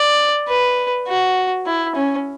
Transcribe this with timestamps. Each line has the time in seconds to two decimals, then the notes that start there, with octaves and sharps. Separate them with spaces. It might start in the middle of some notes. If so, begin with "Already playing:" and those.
Already playing: D5
0.48 B4
1.08 F#4
1.66 E4
1.95 C#4